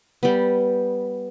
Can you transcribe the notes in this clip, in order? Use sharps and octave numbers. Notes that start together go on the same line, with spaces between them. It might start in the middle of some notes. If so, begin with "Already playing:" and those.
G3 B3